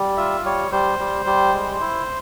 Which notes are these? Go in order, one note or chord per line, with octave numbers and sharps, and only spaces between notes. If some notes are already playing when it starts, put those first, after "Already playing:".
Already playing: G3
F4 E5
G3 C#5
G3 C5
G3
G3
G#3
E4